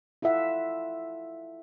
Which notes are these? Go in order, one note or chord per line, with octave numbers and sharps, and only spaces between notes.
E4 F4 A4 E5 F#5